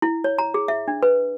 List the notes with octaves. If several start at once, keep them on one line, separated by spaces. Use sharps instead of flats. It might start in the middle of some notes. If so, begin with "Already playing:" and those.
E4
C#5
A#5
G#4
E5
D4
B4